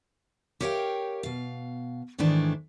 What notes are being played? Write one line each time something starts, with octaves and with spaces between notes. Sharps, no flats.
G4 A#4 C#5 D5 F5 G5
B2 F5
G#2 D#3 E3 A3 D4 G#4